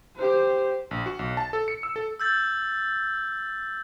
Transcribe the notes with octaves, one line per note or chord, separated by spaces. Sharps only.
G4 C5
A#1
F#4
B1
A5
A4
C#7
E6
A4
E6 G6 A6